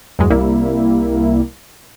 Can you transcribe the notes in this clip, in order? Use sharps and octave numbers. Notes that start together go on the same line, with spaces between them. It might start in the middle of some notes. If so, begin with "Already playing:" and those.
E2 G2 F#3 G#3
C2 G3 A#3 E4